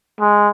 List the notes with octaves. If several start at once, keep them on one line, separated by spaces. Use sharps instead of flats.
G#3